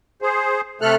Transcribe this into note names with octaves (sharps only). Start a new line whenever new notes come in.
G#4 C5
C3 A3 A4 F6 F#6